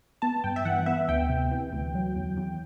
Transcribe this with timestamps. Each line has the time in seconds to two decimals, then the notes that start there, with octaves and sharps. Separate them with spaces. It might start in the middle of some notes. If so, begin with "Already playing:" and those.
0.22 B3 A5
0.44 G2 G5
0.56 E5
0.65 E3 F#5
0.86 B3 E5
1.08 D2 G5
1.29 C3
1.51 E3
1.73 D2
1.95 F#3
2.16 E2
2.37 E2